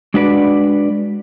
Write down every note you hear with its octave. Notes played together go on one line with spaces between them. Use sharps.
G#3 D4 F#4 B4 D5